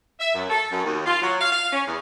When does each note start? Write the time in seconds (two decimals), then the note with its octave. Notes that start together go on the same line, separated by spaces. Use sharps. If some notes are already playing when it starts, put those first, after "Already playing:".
0.20 E5
0.34 F#2
0.50 A4
0.72 F#2
0.84 D#2
1.06 F4
1.22 F#3
1.40 F5
1.53 F5
1.72 C#4
1.87 E2